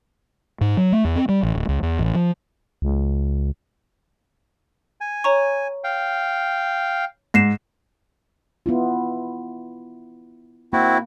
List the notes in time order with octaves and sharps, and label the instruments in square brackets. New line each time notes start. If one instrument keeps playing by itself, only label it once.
[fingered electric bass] G#2
F#3
A3
E2
C4
G3
A1
D1
C#2
E2
A1
F3
[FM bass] C#2
[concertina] G#5
[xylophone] C#5 A#5 C#6
[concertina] F5 G5
[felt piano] G#2 [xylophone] A#6 C7 E7
[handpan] B3 E4 F4
[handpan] A#3 [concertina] C4 E4 F#4